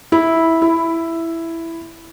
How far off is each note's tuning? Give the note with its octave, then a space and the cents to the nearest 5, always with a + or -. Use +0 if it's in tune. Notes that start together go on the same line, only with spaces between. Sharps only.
E4 -10
E4 +5